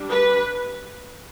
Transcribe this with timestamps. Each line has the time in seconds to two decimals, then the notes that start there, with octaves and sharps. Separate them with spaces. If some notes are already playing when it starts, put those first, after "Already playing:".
Already playing: G3 D4
0.10 B4